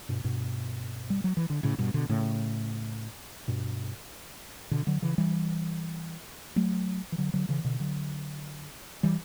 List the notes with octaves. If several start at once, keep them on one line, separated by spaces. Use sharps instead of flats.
G2 B2
G2 B2
G3
F#3
E3
D3
A2 C#3
G2 B2
B2 D3
A2 C#3
G2 B2
B2 D3
D3 F#3
C#3 E3
E3 G3
F#3 A3
E3
D3 F#3
D3 F#3
C#3 E3
B2 D3
D3 F#3
E3 G3